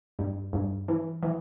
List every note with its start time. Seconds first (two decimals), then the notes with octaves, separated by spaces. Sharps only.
0.19 G2
0.53 G2
0.88 E3
1.23 E3